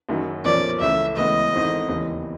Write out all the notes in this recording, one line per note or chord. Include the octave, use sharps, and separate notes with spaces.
F#1 F#2 D#3 F#3
B1 A#2 F3 A#3 C#4 D5
C#2 C#3 E3 A3 E5
D2 C#3 E3 G#3 B3 D#5
G#1 G#2 E3 A3 C4
E1 D#2 C#3 E3